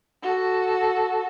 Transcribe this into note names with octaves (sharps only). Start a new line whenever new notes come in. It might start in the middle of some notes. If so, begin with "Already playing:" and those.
F#4 A4